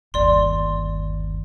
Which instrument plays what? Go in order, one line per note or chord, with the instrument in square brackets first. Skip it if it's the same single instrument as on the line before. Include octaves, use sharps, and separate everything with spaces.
[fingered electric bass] G1 D#2 [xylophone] D5 C6